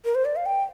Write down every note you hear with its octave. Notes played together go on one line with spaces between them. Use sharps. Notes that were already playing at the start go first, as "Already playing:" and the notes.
A#4
C5
D5
F5
G5